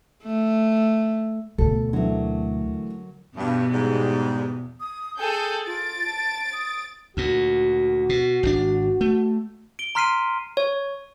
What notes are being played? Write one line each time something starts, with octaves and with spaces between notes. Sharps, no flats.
A3
D2 B2 A4
D3 E3 F#3 A3 A#3
E2 G2 B2 B3
G#2 G3
D#6
G#4 A4 G5 G6
F4 A6 D7
A5
D#6
D2 A#2 F#4
B2
G#1 B2 D4
A3
D7 G7
A#5 C6 F6 B6 C7 D#7
C#5